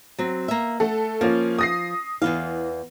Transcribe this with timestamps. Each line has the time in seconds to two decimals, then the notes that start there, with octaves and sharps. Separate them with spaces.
0.19 F#3 C4
0.48 A#3 E5
0.80 A3 A4 F#5
1.21 F3 A#3 C#4
1.59 D#6 A#6 C7
2.22 E2 E3 B3 F5